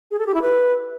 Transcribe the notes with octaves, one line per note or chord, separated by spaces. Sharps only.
G#4
A4
G4
E4
B4